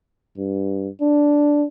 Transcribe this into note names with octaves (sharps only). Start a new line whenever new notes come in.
G2
D4